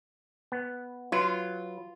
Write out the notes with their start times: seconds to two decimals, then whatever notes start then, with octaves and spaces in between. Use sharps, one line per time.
0.52 B3
1.12 F#3 F4 B4